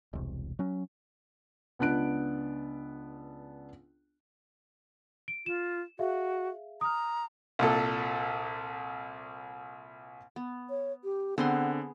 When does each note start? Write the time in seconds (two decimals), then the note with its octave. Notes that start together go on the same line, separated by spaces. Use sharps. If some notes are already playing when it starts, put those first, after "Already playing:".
0.13 E1 C2
0.59 F#3 C#4
1.79 C#2 B3 D4 F#6 D7
5.28 D7
5.46 F4 E7
5.99 F#4 G#4 E5 F5
6.81 A#5 D#6 F6
7.59 C2 A#2 A4
10.36 B3
10.70 C#5
11.04 G4
11.38 D3 B3 C4 G#4 F#5 C6